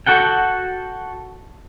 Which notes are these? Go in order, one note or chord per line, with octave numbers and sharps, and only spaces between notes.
F#4 A4 F#5 G5